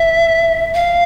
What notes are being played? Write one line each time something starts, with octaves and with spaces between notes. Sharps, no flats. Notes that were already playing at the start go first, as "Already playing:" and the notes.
Already playing: E5
F5